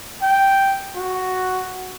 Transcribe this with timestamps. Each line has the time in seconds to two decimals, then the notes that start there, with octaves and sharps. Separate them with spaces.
0.22 G5
0.96 F#4